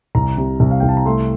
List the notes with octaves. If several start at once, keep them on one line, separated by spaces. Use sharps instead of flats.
C2 A#5
C3
C2
F5
C2 G5
A5
A#5
A3 C6